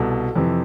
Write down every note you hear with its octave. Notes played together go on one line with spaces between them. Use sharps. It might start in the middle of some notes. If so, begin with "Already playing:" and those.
Already playing: C2 B2 A4
F2 C3 E3